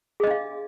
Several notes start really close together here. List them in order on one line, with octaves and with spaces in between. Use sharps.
G#4 D#5 D4 F5